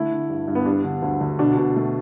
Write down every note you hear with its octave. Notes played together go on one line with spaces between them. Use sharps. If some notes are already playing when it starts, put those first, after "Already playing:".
Already playing: D3 A3 E4
D3
G2
G2
B3
G3 D4
D3
D2
D2
B2 D4
B2
A3